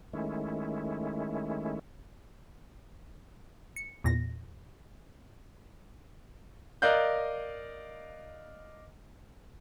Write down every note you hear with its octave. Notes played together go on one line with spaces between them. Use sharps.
D#3 G#3 A3 C#4 E4
C#7
E2 A#2 A#6
A#4 D5 D#5 F5 F#6 G6